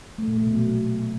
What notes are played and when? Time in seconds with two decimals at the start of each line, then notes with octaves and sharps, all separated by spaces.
0.18 A3
0.28 A#2
0.37 A3
0.47 B2
0.56 F#3